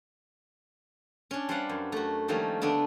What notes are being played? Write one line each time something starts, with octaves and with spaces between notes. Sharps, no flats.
C#4 D4
G3 B4 C5 D5 F5 F#5
F#2
A3 F#4
D#3 F3 G3 A3 A#3 C#4
D3 A3 B3 D4